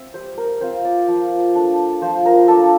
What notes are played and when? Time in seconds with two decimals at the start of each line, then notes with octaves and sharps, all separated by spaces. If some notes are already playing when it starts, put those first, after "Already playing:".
Already playing: C4 E5
0.14 G3 C5
0.38 A#4
0.61 C4 F4 C5
0.85 D5
1.08 F3
1.55 A3 D4
2.02 F3 C5
2.26 A#4
2.48 A3 D4 A4